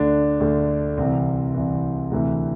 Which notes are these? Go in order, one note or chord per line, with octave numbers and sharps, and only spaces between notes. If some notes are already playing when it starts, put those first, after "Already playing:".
Already playing: D2 D3 D4
D2 D3
C2 C3 E3 C4
C2 C3 E3
D2 C3 E3